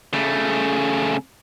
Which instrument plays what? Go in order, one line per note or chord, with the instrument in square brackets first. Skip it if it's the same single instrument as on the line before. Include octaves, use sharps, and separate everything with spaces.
[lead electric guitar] C#3 A3